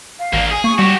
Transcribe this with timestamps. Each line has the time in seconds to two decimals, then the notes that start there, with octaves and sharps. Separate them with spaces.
0.19 F5
0.33 A1 A#3 D4
0.51 G#4 G#5
0.64 A#3 C#6
0.79 G3 F#4 G4 C#6